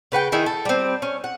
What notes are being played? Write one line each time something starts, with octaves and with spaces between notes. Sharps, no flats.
C#3 B4 F#5 G5
D#3 D#4 E4 G#4
A4
G3 C4
C#4
F#5